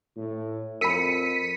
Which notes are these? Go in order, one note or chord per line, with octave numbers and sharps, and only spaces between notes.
A2
F2 A#4 B5 B6 C#7 D#7